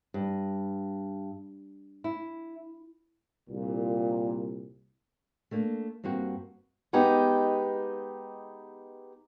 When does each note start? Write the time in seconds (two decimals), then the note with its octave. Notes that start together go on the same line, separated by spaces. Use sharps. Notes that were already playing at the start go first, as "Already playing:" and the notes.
0.14 G2
2.04 E4
3.49 C2 A#2
5.51 A3 A#3 D4
6.04 G2 A#3 C4 F#4
6.93 G#3 B3 D#4 G4